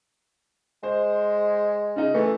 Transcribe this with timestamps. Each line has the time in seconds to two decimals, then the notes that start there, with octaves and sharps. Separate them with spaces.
0.83 G#3 C5
1.96 C#3 D#4
2.14 E3 A3